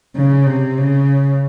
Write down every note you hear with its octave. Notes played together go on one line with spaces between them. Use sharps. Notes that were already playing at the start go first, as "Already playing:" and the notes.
C#3
C3
C#3